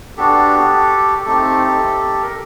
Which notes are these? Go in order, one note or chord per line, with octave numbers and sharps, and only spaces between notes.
B3 D4 F#4 G4 A4
A3 C4 D#4 G4 A4
A#4